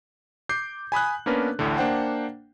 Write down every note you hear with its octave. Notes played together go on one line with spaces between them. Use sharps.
D6 G6 C7
G#5 B5 D#6 F#6
A#3 B3 C#4 D4 A#4 B4
A1 D2 A2 D3
A#3 D4 C5 F#5 G5